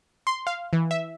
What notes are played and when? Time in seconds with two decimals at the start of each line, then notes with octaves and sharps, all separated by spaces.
0.27 C6
0.47 F5
0.73 E3
0.91 E5